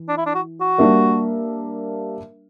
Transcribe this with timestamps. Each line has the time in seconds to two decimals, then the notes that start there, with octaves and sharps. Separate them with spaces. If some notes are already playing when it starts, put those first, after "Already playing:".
Already playing: E3
0.09 D4
0.18 E4
0.26 D4
0.35 F#4
0.61 F#4
0.78 G3 A#3 D4 A#4 E5